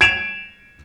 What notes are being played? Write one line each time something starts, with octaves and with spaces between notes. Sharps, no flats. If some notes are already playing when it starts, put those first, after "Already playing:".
G#6 D7 E7 F7